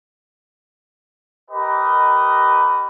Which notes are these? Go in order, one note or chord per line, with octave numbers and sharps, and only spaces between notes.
G4 A#4 B4 D#5